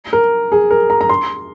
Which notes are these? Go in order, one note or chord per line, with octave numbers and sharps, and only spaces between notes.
A#4
G#4
A#4
A#5
A#5
C6